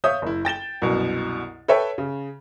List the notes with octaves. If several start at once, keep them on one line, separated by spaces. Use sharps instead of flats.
C#5 E5 F5 D#6 G6
F#1 E4
G5 A6 E7 G7
C2 F#2 B2
A4 B4 C#5 E5 G5
C#3